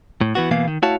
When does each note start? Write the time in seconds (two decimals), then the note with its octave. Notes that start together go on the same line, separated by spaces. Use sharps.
0.21 A2
0.35 E3 B3 F#4
0.51 B2 E3 A#3 B3 F5
0.67 D#3
0.82 A3 E4 F#4 C#5 F5 A5